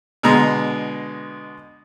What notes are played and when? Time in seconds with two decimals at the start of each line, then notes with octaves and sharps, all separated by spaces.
0.23 B2 D3 G#3 A#5